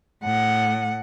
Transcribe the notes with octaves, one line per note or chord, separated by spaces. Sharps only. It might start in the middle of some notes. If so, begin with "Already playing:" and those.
A2 F#5